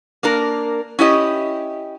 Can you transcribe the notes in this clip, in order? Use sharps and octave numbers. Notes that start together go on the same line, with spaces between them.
A#3 D4 A#4
C#4 E4 G4 D#5